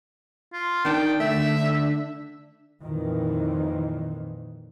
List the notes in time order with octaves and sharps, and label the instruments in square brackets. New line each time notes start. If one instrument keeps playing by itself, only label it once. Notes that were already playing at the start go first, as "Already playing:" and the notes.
[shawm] F4
[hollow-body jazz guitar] D#3 D4 [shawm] G5
[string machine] D3 D4 [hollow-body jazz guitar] A3 [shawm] E5
[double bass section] F2 A#2 D#3 E3